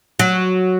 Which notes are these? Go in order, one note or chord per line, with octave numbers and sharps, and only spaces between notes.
F#3